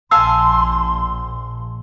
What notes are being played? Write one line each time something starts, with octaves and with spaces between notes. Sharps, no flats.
A#1 F5 G#5 A5 C6 E6